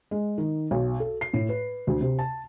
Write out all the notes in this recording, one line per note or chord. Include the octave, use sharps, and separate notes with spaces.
G#3
D#3
B1
A4
C7
A2
B4
D2
C3
A5